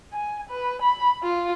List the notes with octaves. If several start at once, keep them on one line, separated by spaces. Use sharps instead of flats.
G#5
B4
B5
F4